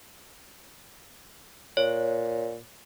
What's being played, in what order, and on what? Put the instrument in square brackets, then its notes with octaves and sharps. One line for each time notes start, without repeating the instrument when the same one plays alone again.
[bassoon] A#2 [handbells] C#5